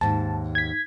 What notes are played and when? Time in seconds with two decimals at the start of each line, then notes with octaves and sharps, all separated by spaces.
0.01 D#2 G#2 A5
0.55 G#6 B6